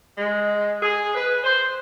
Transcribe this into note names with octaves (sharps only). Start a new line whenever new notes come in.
G#3
G#4
B4
C5